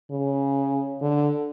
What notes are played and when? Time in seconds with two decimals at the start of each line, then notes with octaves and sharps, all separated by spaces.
0.11 C#3
1.01 D3